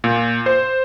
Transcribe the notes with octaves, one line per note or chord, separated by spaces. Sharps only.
A#2
C5